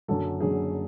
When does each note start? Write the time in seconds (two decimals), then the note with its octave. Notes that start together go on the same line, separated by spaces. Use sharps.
0.08 F#1 F#2 D3 F#3 A4
0.40 F#1 F#2 D3 F#3 G#4